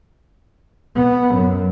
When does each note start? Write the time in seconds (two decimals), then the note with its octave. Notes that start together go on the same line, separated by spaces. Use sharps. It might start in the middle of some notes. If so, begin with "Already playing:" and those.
0.96 B3
1.35 F#2